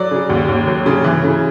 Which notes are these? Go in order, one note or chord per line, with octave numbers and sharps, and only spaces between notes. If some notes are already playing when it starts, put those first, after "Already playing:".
Already playing: F#3 D5
C#3
D#2
D#2
F#3
C#3
E3
C#3